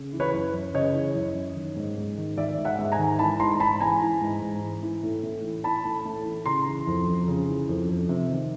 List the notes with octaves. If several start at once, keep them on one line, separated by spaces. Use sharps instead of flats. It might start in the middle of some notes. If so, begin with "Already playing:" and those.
Already playing: C#3
E3
B4 C#5
F#2
F#2
C#3 C#5 D#5
E3
F#2
F#2
D#3
G#2
G#2
D#3
D#3 D5 E5
G#2
E5 F#5
G#2
G#5 A#5
D#3
E3 A5 B5
G#2 A#5 C6
G#2 A5 B5
E3 G#5 A#5
E3
G#2
G#2
E3
E3
A2
A2
E3
E3 A5 B5
A2
A2
E3
C#3 A#5 C6
E3
F2
F2
C#3
E3
F2
F2
C3
D#3